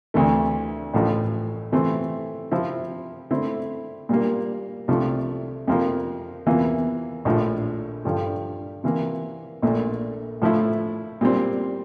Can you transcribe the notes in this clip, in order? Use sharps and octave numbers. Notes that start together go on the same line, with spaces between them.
D2 C3 E3 A3
A1 A2 F3
C3 E3 A3 C4
C3 F3 C4 E4
D3 A3 C4 E4
A#2 G3 A#3
C2 C3 F3 A3
F2 C3 F3 A#3
E2 C3 E3 A#3 F4
A#1 A2 F3
G2 D3 F3
C3 E3 A#3
A#1 A#2 A3
A2 F3 A3 E4
A#2 G3 C4